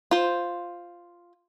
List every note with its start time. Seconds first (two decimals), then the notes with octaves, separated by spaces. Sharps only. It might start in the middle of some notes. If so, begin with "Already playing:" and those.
0.11 F4 C5